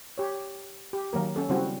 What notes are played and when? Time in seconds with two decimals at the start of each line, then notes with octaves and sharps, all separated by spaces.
0.18 G4 C#5
0.93 G4
1.13 D#3 F#3 A#3 A#4
1.36 C#4 A4
1.49 C#3 G3 C4 E4 F#4